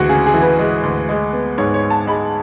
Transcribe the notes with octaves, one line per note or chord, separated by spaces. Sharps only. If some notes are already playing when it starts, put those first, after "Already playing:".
Already playing: D2 E3 G#3 F#4
C#3 G#4
G#4
E3
B4
G#3
D2
G#3
B3
G#2 C#5
C#5
G#2
A5
G#3 B5